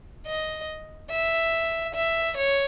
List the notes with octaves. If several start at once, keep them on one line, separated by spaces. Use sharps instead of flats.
D#5
E5
E5
C#5